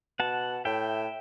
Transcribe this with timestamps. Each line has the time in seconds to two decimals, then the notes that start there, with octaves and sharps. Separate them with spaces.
0.19 B2 F#5 A5
0.65 A2 E5 G5